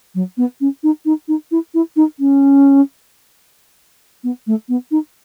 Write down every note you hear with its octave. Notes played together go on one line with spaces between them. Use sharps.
F#3
B3
C#4
D#4
D#4
D#4
E4
E4
D#4
C#4
B3
A3
B3
D#4